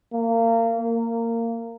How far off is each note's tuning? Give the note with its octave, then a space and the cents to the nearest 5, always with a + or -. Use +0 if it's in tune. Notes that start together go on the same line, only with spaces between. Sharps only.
A#3 -30
A#3 -20